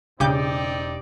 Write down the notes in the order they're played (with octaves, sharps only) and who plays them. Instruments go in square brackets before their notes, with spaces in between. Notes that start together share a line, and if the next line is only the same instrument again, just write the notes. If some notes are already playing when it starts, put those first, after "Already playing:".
[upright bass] E1 [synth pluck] C#3 D6 G6 [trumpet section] C4 D#4 D5 [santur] G4